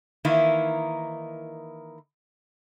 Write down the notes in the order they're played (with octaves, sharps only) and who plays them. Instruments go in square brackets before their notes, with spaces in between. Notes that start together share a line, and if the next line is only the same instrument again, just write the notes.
[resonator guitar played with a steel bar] D#3 E3 A#3 D#4 E4